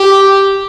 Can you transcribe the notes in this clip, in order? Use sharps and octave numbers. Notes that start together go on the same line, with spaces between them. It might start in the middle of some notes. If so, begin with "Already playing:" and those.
Already playing: G4